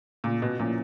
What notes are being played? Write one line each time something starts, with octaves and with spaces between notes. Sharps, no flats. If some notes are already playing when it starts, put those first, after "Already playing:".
A#2 C#3
B2
A#2 F3 A#3 C#4 E4